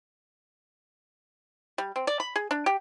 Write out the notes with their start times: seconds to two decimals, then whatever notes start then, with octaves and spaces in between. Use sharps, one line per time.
1.78 G3
1.96 C4
2.07 D5
2.20 B5
2.36 G#4
2.51 D4
2.66 G4